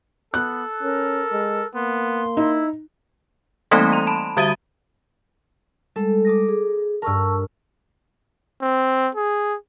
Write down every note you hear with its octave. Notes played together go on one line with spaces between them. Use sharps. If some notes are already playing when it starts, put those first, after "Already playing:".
B3 A4 F#6
C#4 A#4
G#3
A#3 B3 C6
D#4 E4
E3 G3 A3 A#3 C4 D#4
A#5 C6
A5 B5
D3 G3 F#4 E5 D#6 D#7
G3 G#3 A4
D6 D#6 A#6
G#4
G2 A#4 A5 C#6 E6
C4
G#4